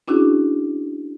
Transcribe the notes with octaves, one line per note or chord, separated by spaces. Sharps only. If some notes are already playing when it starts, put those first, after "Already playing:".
C#4 D4 E4 F#4 G#4